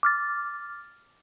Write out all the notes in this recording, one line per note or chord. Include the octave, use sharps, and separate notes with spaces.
D6 F6 A6